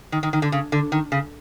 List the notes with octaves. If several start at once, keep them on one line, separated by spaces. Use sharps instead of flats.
D#3
D#3
D#3
D3
C#3
D3
D#3
C#3